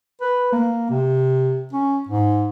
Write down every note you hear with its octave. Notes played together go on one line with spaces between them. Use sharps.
B4
A#3
C3
C#4
G#2